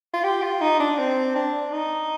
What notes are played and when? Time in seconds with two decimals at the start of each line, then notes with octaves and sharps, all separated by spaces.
0.14 F4
0.24 G4
0.42 F4
0.61 D#4
0.80 D4
0.99 C4
1.35 D4
1.72 D#4